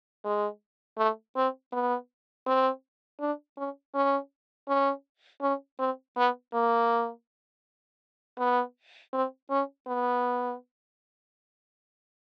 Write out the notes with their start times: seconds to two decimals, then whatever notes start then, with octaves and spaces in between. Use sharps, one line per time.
0.24 G#3
0.98 A3
1.36 C4
1.72 B3
2.47 C4
3.20 D4
3.58 C#4
3.95 C#4
4.68 C#4
5.42 C#4
5.79 C4
6.17 B3
6.54 A#3
8.38 B3
9.13 C4
9.50 C#4
9.87 B3